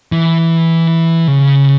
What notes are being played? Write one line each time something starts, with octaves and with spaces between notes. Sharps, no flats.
E3
C#3